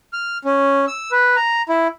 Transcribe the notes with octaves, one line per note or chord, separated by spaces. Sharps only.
F6
C#4
E6
B4
A#5
E4